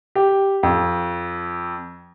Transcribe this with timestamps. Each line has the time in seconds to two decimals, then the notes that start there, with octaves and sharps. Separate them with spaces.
0.15 G4
0.63 F2